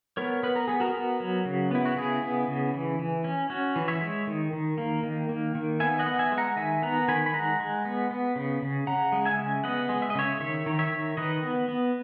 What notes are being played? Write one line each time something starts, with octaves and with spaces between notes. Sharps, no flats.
B3 A#4 C#5
B3 B4
A#4
B3 G#4
F#4 A#4
B3
F#3
C#3
B3 E4
F#4
C#3 E4 G#4
B3
C#3
E3
E3
C#4
C#4 F#4
E3
C#5 E5
G#3
D#3
D#3
A#3
D#3
A#3
D#3
B3 E5 G#5
D#5 F#5
B3
E5 G#5
G#3
F#5 A#5
D#3 E5 G#5
B3 F#5 A#5
D#3 G#5 B5
B5
G#3 F#5 A#5
G#3
B3
B3
C#3
C#3
C#3 F#5 A#5
G#3
E5 G#5
C#3
B3 D#5 F#5
G#3
E5
D#5
C#3 C#5 E5
D#3 C#5 E5
D#3
C#5 E5
D#3
D#3 B4 D#5
B3
B3